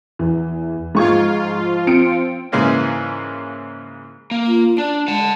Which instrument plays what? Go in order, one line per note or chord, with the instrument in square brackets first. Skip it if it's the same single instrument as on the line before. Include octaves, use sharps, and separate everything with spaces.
[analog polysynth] E2 [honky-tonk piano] E3
[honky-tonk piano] G#2 C#6 G#6 [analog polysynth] F3 F4
[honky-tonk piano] C4 C#7 D7
[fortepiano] G#2 C#3 E3 G#3 A#3 C#4
[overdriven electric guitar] A#3
[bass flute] F4
[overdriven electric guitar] D4 [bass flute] D5
[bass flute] G#3 [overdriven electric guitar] F#5 A5